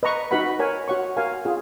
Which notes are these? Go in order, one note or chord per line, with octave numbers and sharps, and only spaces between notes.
B4 D#5 A#5 C#6
D#4 F#4 B4 F#5 B5
A#4 C#5 G#5
F#4 C#5 F#5 C#6
F#4 A#4 F5 G#5
F4 G#4